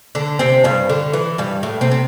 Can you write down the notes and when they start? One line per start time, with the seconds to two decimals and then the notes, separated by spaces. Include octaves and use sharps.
0.15 D3 D4
0.39 C3 C4
0.64 G2 G3
0.89 D3
1.14 E3
1.38 G2 G3
1.63 A2 A3
1.81 C3 C4
1.91 C4